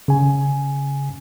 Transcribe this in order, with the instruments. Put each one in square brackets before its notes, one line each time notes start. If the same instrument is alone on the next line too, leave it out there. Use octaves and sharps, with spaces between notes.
[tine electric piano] C#3 G#5